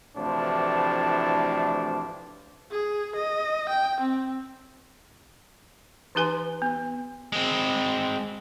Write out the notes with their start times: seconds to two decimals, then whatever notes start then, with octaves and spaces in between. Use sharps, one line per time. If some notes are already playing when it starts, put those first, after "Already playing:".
0.16 D2 A2 C3 E3 F3 D4
2.71 G#4
3.15 D#5
3.69 G5
4.00 C4
6.15 E3 D#4 G4 B4 G#5 C6
6.62 B3
7.32 G#3 C4